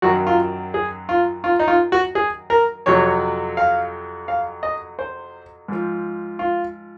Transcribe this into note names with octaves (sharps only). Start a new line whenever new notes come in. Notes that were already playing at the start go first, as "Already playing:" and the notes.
F#2 D#3 F#3 F#4
F4
G#4
F4
F4
D#4
F4
F#4
G#4
A#4
F2 C3 F#3 C#5
F5
F5
D#5
C5
G#2 F3
F4